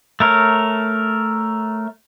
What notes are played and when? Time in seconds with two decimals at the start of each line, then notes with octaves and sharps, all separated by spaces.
0.20 A3 A#4 C#5